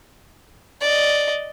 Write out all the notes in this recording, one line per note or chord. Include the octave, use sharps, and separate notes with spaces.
D5 D#5